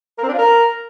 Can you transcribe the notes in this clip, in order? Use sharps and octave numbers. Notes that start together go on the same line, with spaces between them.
A#4
C4
D4
F4
A#4